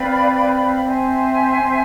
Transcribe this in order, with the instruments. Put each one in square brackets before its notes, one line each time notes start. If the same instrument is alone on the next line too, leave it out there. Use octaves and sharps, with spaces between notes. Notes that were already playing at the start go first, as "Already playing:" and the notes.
Already playing: [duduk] C4 [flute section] B4 D5 F5 B5
[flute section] C5 E5 G#5
[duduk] C4